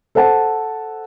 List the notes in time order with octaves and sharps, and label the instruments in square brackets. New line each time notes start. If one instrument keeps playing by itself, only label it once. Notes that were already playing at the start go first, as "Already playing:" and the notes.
[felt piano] A4 C5 F#5 A5